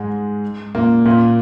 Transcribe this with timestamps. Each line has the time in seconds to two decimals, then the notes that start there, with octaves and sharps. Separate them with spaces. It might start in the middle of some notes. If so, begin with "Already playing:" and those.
Already playing: G#2 G#3
0.75 A#2 A#3
1.05 A#2 A#3